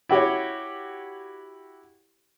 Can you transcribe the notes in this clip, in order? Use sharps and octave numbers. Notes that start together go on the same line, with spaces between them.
E4 F#4 G4 C#5